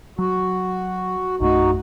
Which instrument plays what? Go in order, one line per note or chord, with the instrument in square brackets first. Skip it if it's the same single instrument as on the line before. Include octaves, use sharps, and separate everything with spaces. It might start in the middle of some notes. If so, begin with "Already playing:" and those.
[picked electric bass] F#3 [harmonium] F#4
[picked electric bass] A#1 F#2 A3 [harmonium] D#4 F#4